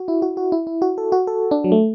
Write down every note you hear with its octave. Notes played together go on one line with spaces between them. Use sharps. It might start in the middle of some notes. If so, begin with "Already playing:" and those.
Already playing: F#4
E4
F#4
F#4
E4
E4
F#4
A4
F#4
A4
D4
F#3
A3